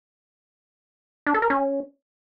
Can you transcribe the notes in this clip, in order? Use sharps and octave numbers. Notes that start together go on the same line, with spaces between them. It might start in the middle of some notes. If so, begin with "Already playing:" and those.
D4
A4
A#4
C#4